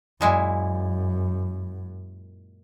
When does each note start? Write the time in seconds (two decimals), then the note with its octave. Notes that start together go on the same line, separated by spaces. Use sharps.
0.21 F#2 A#2 G#3 E4